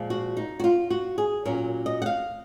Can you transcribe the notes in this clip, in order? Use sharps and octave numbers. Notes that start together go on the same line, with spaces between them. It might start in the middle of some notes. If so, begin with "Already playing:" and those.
Already playing: A#2 F3 G#3
F#4
D#4
F#4
F4
F#4
G#4
A#2 F#3 C#4 A#4
D#5
F#5
F5